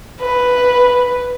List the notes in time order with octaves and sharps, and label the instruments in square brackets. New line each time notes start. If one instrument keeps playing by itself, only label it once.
[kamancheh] B4